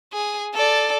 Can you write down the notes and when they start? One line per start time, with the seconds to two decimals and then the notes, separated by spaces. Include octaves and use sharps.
0.13 G#4
0.55 A4 D5